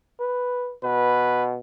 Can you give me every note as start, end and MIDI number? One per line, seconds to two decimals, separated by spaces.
0.20 0.74 71
0.84 1.59 47
0.84 1.45 71